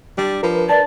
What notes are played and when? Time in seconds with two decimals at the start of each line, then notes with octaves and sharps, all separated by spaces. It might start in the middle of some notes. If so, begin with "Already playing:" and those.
0.18 G3 D4
0.43 F3 A#4 B4
0.69 D5 A5